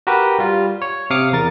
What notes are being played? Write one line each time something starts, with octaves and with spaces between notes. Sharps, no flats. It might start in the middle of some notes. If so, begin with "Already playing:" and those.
F#4 G4 A#4 B4
G3 F4
C#5
C3 F5 D6 D#6 F6 C#7
E2 A#4 A6